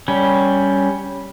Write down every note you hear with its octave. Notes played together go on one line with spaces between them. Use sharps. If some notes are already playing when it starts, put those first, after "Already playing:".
G3 C#4